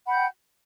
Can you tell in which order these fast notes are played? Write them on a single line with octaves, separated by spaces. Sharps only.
F#5 B5 G6 G5